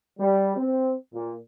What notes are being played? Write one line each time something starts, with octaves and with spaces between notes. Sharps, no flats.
G3
C4
A#2